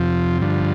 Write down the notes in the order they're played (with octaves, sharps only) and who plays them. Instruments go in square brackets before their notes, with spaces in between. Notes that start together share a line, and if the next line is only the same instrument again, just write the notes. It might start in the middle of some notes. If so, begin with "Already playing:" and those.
Already playing: [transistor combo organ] F2 C3 F3
G2 D3 F3